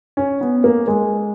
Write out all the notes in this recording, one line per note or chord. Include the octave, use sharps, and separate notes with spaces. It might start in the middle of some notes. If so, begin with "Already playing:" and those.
C#4
B3
A#3
G#3